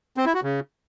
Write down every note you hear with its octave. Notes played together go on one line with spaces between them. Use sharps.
C4
E4
F#4
C#3